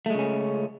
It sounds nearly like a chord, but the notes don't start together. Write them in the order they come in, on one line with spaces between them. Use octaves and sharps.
A3 G#3 C#3 C#4